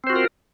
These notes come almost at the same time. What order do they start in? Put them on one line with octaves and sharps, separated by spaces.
C4 C5 F#4 F4 A#4